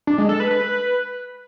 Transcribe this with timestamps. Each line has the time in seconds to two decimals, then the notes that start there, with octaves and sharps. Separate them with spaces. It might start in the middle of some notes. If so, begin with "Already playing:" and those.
0.07 D4
0.18 G#3
0.29 A4
0.40 B4
0.51 B4